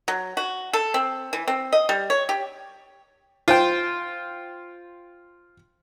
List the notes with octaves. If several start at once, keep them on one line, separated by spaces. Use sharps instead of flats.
F#3
F#4
A4
C4
E3
C4
D#5
G3
C#5
G4
F4 C5 G5